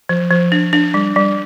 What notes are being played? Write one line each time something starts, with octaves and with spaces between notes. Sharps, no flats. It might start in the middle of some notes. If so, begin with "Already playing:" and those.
F3
F3
D4
D4
G3
G3